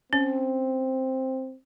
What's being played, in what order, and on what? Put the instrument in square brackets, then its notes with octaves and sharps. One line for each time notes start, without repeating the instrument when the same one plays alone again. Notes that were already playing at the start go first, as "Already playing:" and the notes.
[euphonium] C4 [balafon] C#4